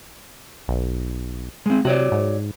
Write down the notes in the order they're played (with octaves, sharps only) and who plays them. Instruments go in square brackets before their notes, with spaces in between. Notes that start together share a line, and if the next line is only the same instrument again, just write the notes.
[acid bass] B1
[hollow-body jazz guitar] G#3 C4
[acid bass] C3 [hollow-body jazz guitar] F#4 C#5 D5
[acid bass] G#2